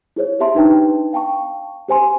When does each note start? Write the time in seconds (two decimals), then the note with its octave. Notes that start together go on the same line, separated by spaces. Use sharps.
0.16 E4 G#4 C5 C#5
0.40 G4 E5 A5 C6
0.55 D4 D#4 B4 G5 A5
1.13 F5 G5 A5 C#6
1.88 G4 C5 G#5 C6